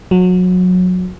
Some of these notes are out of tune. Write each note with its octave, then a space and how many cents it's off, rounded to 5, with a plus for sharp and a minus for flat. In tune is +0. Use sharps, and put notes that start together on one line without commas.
F#3 -25